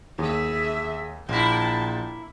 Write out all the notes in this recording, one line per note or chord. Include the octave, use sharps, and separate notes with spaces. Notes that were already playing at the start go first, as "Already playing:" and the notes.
D#2 G#4 E5
A#1 A#3 E4 G5 A5 C6 B6